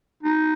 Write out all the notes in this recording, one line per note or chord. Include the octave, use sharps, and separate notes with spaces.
D#4